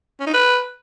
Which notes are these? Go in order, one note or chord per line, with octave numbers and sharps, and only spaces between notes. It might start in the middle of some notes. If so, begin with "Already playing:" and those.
C#4
D#4
B4